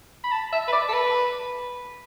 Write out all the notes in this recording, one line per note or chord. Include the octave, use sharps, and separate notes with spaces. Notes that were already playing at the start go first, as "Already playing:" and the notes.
B5
A5
E5
B4
D5
A4
B4